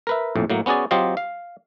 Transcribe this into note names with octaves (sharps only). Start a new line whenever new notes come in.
A#4 B4 E5
A#1 F2 A2
A2 F#3 A#3
B3 C#4 F#4 G#4 D5
F#3 C4 F4 G4 D#5 F5
F5